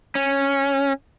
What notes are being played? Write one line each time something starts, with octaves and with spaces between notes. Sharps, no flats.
C#4